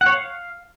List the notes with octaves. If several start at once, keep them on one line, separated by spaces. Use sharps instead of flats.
F#5
C#5
F5